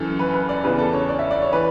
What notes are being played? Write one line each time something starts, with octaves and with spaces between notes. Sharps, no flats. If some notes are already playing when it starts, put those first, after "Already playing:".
Already playing: F#2 E3 A4
B4
B4
D5
E2 C#3 E3 B4
A4
C#5
D5
E5
D5
C#5
E3 B4